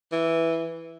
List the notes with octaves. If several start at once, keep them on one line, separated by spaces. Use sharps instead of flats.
E3